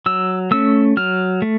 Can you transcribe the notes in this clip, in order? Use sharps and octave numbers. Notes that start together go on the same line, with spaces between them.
F#3 E6
A3 C#4 E6
F#3 F6
A3